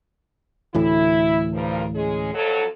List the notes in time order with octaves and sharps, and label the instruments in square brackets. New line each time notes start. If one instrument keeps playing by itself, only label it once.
[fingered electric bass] D2 A2 E3 [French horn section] E4
[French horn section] G2 F3 A#4
G#3 C#4 G#4
F2 F#3 A4